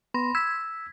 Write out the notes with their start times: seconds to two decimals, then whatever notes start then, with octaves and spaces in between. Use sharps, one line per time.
0.14 B3 B5 C6 A#6
0.35 E6 G#6 B6